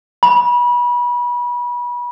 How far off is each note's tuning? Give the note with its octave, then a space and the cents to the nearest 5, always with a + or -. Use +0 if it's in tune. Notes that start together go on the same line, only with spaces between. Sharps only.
B5 -30